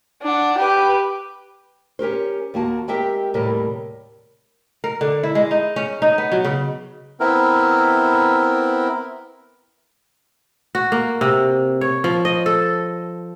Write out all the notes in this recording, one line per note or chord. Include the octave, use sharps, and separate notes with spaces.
D4 F#5
G4 B4
C#4 G4 A#4 C5
D#2 A#3 F#4 A5
G#3 C4 G4 A#4 E5 G5
D#2 A2 C3 G3 A#4 D#5
A#4
D3
E4
G#3
D#4
C#4
D#4
B3
F#3
C#3
B3 C4 E4 A#4
F#4
A#3
C3
C#5
F3
D#5
A4